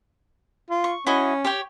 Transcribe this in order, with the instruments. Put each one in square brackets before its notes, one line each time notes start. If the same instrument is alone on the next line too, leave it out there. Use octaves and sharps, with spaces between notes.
[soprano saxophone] F4
[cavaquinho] C#6
[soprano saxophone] C#4 [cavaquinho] E4 F#4 D#5
[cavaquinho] G4 C#5 G5